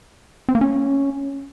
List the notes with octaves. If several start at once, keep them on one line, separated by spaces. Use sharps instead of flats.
C4
A#3
C#4